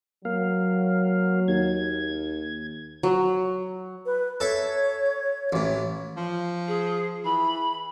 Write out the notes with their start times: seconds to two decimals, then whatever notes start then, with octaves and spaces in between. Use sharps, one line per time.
0.25 F#3 A#3 F5
1.48 D#2 G#6
3.03 F#3
4.06 B4
4.40 A4 C#5 E5
5.53 A1 A2
6.17 F3
6.68 G#4
7.25 E3 B5